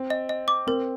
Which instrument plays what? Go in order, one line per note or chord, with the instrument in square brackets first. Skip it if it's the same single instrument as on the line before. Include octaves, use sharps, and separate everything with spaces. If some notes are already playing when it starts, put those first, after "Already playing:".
Already playing: [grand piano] C4
[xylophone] D#5
D#5
D6
[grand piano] C4 [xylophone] A#4